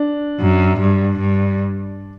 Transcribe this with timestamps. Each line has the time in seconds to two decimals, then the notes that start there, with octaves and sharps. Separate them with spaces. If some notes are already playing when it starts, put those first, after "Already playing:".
Already playing: D4
0.40 F#2
0.79 G2
1.19 G2